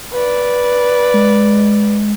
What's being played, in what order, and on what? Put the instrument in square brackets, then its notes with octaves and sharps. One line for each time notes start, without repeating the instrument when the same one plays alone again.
[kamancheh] B4 D5
[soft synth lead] G#3